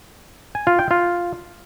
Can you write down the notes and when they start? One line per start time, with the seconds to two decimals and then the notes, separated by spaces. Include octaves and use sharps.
0.55 G#5
0.67 F4
0.79 G5
0.91 F4